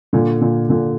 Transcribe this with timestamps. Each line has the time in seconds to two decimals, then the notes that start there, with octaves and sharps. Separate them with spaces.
0.13 A#2 D3
0.41 A#2 D3
0.69 A#2 D3